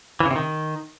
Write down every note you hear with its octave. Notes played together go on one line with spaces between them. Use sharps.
E3
C#3
C3
D#3